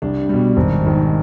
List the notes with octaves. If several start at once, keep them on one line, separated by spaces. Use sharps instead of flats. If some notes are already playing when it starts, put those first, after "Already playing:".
C2 D4
B2 G3
G#1
G#2 D#3